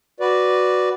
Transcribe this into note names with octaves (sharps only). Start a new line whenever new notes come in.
F#4 B4 D5